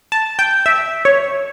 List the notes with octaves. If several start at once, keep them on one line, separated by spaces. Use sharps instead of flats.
A5
G5
E5
C#5